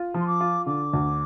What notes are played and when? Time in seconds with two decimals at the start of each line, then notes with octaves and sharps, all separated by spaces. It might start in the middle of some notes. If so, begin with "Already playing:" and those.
Already playing: F4
0.14 F3 C6
0.27 D6
0.40 F4
0.66 D3 D6
0.93 D2